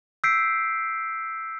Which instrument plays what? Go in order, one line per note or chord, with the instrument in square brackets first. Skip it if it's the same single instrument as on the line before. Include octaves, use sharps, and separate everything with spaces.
[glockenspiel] E6 G6 B6 C7 D7